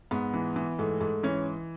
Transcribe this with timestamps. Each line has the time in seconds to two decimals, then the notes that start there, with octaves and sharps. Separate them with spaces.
0.11 G#2 B3
0.34 E3
0.56 E3
0.79 G#2 A3
1.00 G#2 A3
1.23 E3 C#4